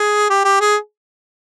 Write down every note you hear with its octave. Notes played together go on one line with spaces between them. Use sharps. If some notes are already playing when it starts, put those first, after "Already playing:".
Already playing: G#4
G4
G4
G#4